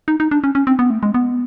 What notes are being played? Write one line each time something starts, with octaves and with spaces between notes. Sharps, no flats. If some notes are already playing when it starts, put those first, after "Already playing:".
D#4
D#4
D4
C#4
C#4
C4
B3
A3
G#3
B3